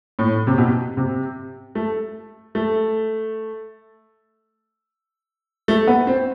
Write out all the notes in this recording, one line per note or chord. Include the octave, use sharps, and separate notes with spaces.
A2
C3
B2
C3
A3
A3
A3
B3
C4